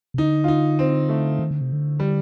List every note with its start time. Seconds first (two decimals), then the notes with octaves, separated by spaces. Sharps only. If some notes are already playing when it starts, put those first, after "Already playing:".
0.14 C3
0.18 D3 D#4
0.44 F4
0.48 D#4
0.79 C4
1.09 A3
1.39 D#3
1.51 D3
1.61 C3
1.72 D3
2.00 G3